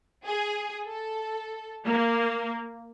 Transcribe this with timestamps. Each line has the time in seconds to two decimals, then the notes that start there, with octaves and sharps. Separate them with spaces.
0.25 G#4
0.84 A4
1.86 A#3